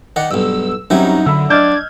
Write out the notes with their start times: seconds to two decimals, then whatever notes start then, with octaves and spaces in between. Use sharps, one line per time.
0.16 D#3 D5 F#5
0.31 B1 G2 E6
0.90 F#2 F#3 G3 C4 C#4 D#4 E4
1.26 D3 B5 E6
1.50 D4 D#5 F6 G6 G#6